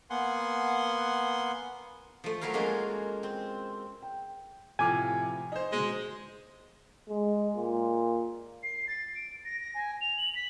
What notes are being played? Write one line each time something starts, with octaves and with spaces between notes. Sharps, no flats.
A#3 B3 F#5 G#5 C6
F3 A3
F#3 A3 E4 A#4 F5
G#3 A#3 C#4 F4 F#4 A#4
C4
G5
A2 C3 F3 A3 G#5 D6 F6
D#4 C5
B2 G#3
G#3
A#2
C7
A6
D7
A#6
A#6
G#5
F7
F#7
B6